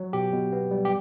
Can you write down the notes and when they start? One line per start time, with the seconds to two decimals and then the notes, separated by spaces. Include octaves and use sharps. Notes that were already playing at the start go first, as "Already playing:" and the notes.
Already playing: F#3
0.13 B2 G4
0.33 B2
0.53 B3
0.71 G3
0.85 G4